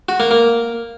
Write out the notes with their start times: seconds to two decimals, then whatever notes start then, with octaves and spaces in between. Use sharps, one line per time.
0.09 F#4
0.20 A#3
0.31 A#3